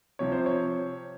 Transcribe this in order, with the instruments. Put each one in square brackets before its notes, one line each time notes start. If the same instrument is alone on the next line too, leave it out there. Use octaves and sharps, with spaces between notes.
[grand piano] C3 F3 C#5
C5
C#5